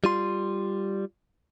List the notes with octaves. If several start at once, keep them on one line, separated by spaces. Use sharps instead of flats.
G3 F4 C6